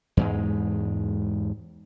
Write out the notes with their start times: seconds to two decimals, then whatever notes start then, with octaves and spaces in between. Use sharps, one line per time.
0.17 E2 G#2 G#3